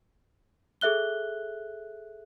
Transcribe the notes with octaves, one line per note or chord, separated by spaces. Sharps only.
G#4 A4 E5 F#6 G7